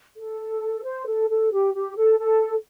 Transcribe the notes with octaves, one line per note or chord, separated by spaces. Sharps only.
A4
C5
A4
A4
G4
G4
A4
A4